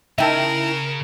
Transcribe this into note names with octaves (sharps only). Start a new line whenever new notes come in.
C#3 D#4 E4 A#4 E5 G5 A5